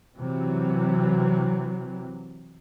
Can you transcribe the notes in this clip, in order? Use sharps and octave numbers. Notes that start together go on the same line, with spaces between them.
C3 E3 F#3